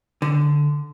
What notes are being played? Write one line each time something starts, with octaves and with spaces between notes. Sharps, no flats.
D3